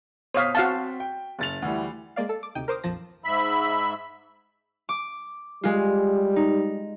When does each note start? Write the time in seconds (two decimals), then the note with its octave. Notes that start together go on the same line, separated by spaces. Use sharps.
0.34 B2 C5 C#5 F5 D#6 B6
0.55 C4 F#4 F5 A5
1.00 G5
1.39 F#1 A6 F7
1.62 D2 E3 G3
2.16 G#3 A#3 D5 F5
2.29 A4
2.43 D6
2.55 D2 C3 D#4 G5 D#7
2.68 A#4 C5 D6 D#6
2.84 A#1 F2 F3 A5 A#6
3.25 G#2 E5 B5
4.89 D6
5.64 G3 G#3 F4
6.36 D#4